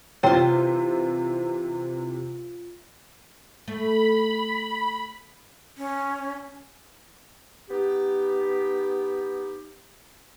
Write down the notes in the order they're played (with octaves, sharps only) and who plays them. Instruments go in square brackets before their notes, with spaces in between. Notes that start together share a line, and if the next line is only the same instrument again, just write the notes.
[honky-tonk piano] C3 E3 [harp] F4 C5 [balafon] C#5 G5
[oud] A3 [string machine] B5
[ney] C#4
[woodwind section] B3 D#4 G4